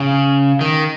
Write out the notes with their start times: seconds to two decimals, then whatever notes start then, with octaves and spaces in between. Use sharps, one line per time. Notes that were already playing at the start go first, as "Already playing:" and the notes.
Already playing: C#3
0.61 D#3